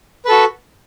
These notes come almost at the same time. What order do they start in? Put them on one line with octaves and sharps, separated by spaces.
B4 A4 F#4